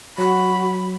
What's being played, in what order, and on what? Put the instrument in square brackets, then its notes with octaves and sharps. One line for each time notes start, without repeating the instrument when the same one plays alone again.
[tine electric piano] F#3 [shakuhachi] F#4 [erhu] B5